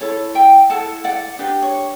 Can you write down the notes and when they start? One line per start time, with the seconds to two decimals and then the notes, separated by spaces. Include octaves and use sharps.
0.01 E4 A4 C#5
0.35 E5 G5
0.70 E4 A4 F#5 A5
1.04 D5 F#5
1.39 D4 G4 B4
1.62 C#5